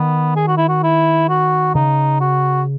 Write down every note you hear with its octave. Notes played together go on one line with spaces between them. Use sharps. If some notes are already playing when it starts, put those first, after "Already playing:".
Already playing: D#3 B3
G#4
F#4
E4
F#4
E4
F#4
C#3 D#4
F#4